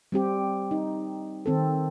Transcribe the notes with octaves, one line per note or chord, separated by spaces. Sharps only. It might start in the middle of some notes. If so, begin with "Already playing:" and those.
G3 C4 G4
D#4
D#3 C4 A4